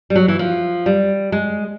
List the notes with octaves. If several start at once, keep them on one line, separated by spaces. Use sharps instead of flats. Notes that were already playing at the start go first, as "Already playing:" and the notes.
G3
F#3
E3
F3
G3
G#3